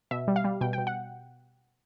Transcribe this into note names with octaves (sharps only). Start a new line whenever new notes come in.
B2 E5
G3
F5
G3
B2 G5
B2 G5
F#5